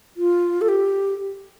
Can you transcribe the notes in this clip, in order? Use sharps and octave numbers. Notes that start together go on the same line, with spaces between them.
F4
A4
G4